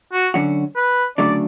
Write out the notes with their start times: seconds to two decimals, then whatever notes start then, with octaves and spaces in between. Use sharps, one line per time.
0.13 F#4
0.34 D3 F#3 C#4 F#4
0.76 B4
1.18 D2 C#3 F#3 A3 D4 D5